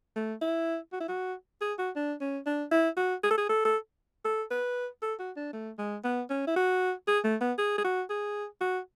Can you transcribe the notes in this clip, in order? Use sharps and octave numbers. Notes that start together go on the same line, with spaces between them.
A3
E4
F#4
E4
F#4
G#4
F#4
D4
C#4
D4
E4
F#4
G#4
A4
G#4
A4
A4
A4
B4
A4
F#4
D4
A3
G#3
B3
C#4
E4
F#4
G#4
A3
B3
G#4
G#4
F#4
G#4
F#4